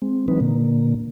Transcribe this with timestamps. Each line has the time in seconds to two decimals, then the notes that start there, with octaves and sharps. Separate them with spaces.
0.02 G#3 C4
0.28 E3 F#3 G#3 C4 D#4 B4
0.40 A#2 D3 A#3